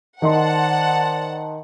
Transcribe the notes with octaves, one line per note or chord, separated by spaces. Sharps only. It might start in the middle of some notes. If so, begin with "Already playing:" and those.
D#3 C5 D5 D#5 F#5 A5 C6